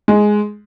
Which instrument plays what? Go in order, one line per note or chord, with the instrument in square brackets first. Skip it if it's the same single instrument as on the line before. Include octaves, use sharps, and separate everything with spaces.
[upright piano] G#3